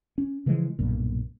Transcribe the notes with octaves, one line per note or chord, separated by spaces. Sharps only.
C#4
C#3 E3 F3 G#3
B1 G2 A#2